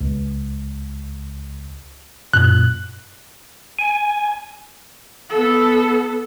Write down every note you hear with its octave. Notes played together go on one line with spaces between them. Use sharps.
C#2
F#2 A#2 F#6
G#5
B3 A4